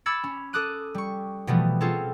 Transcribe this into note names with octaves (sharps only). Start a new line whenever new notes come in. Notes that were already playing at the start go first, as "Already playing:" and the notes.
B5 D6 E6 G#6 A6 C#7
C#4
A4 D6 D#6 F#6 D#7
G3 C#6
B2 E3 F3 G3 A3 B3
C4 C#4 F4 G#4 A4